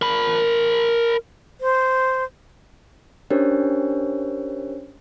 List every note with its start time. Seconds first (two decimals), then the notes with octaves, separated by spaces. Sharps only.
0.02 A#4 B5
1.61 C5
3.30 C#4 D4 G4 A#4 C5 C#5